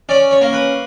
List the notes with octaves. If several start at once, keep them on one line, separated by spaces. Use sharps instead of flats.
C#4 D5
C#5
A#3
B4